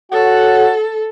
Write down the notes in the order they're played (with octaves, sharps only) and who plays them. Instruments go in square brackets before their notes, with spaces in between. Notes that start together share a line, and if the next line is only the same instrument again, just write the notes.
[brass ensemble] F#4 C#5 F#5 [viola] A4